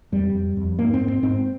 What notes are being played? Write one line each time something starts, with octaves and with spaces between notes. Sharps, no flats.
F2 G3
F2
F2
G#2 A#3
C4
G#2
C4
G#2 C4